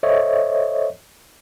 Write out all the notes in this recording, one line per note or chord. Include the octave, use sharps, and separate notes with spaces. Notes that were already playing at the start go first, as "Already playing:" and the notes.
A4 C5 C#5 D#5 E5